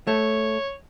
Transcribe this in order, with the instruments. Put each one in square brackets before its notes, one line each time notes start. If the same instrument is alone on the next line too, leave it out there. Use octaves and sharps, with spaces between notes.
[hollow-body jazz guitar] A3 [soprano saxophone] C#5